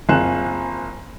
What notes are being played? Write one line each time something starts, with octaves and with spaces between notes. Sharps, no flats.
F#1 C4 F4 G#4 F#6 E7